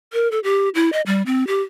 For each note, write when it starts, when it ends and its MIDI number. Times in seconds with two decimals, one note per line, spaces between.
0.13 0.30 70
0.31 0.39 69
0.44 0.69 67
0.75 0.92 64
0.92 1.01 75
1.06 1.23 55
1.26 1.47 60
1.47 1.61 67